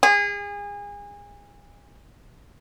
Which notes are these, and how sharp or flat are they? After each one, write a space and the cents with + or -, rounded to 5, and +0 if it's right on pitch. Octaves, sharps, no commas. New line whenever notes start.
G#4 -30